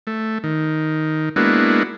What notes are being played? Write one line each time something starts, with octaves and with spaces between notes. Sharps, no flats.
A3
D#3
G#3 A#3 B3 D4 E4 F#4